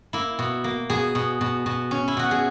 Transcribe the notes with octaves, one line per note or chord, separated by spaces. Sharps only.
A#3 E4
B2
A#3
B2 G#4
B2
B2
B2
C#4
E4
B2 F#4
G#4